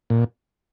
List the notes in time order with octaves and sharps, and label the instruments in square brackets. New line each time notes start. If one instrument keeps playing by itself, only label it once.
[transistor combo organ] A#2